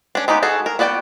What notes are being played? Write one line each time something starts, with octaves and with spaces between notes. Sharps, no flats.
C#4 D4
G#3 B3 D#4 G4
F#4 G#4 A4
A#4
B3 F#4 D5 F#5 G5